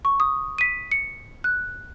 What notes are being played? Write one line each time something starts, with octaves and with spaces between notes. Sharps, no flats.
C#6
D#6
B6 D#7
C#7
F#6